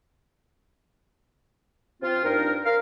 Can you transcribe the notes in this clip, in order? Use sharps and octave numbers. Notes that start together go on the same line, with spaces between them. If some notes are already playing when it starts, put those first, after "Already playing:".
C4 F4
G2 D#4 A#4
A#4 F5